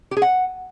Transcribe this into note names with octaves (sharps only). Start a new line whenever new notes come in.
G4
G#4
F#5